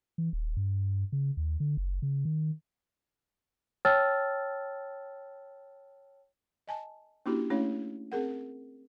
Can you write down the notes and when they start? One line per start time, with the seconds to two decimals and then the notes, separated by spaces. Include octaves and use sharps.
0.18 E3
0.33 D#1
0.56 G2
1.12 C#3
1.37 D#2
1.60 D3
1.77 F#1
2.02 C#3
2.25 D#3
3.85 C#5 G5 A5 E6 F6 A6
6.68 D#5 G#5 A5
7.26 A#3 C#4 D4 E4 F#4 G4
7.50 A3 C#4 D4 E4 C#5 F5
8.12 C4 G#4 A#4 F#5